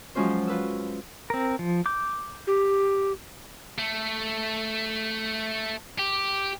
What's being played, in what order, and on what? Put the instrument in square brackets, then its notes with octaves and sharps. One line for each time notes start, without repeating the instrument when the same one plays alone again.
[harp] F3 F#3 G#3 C#4 F4 C5
F4 B4 E6
[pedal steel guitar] C4 A#4
F3
D6 G6
[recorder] G4
[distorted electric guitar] A3
G4